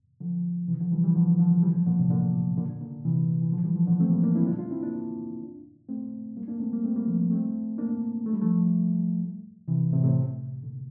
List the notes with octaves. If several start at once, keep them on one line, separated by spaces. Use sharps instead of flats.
D3 F3
C3 E3
D3 F3
E3 G3
E3 G3
D3 F3
D3 F3
E3 G3
D3 F3
A#2 D3
A2 C3
A#2 D3
A#2 D3
A#2 D3
C3 E3
E3
D3 F3
E3 G3
D3 F3
A#2 D3
A3 C4
G3 A#3
A#3 D4
C4 E4
D4 F4
D4 F4
C4 E4
A#3 D4
A3 C4
G3 A#3
A#3 D4
A3 C4
G3 A#3
A3 C4
G3 A#3
F3 A3
A3 C4
A#3 D4
A3
G3
F3 A3
C3 E3
A2 C3
A2 C3
A#2 D3